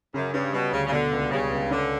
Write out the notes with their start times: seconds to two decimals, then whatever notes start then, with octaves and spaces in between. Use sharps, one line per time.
0.14 F#2 C#3
0.33 G2 C#4
0.53 B2 G3
0.72 D2 C#3
0.86 C#3
0.92 B2 D3
1.11 C#2
1.30 C#3 G3
1.50 C#2
1.70 D3 C#4